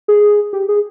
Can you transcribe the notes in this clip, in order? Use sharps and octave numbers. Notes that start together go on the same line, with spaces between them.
G#4
G4
G#4